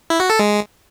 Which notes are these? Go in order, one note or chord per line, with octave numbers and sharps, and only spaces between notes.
E4
F#4
A4
G#3